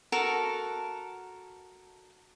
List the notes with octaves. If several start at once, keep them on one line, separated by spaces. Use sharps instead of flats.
F#4 A4 A#4 A5